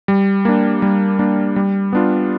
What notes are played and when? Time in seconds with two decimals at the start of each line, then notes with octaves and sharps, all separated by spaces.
0.08 G3
0.45 A#3 D4
0.82 G3
1.19 A#3 D4
1.56 G3
1.93 B3 D4 F4